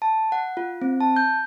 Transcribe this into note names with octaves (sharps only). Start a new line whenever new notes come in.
A5
F#5
F4
C4
A5
G6